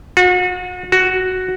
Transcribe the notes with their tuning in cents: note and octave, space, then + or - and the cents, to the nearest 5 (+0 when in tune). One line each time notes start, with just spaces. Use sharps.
F#4 -35
F#4 +5